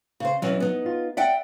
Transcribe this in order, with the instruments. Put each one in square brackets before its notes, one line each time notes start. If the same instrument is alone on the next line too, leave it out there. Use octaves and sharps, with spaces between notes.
[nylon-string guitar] C#3 C5
[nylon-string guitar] B2 E3 C#4 [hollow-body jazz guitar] F#3
[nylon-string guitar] B3 D#4
[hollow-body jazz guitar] F4
[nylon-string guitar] D5 F#5 G5 [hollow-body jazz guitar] E5